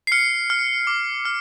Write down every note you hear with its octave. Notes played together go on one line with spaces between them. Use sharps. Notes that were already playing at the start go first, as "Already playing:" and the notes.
C7
F6 C#7
F6
D6
F6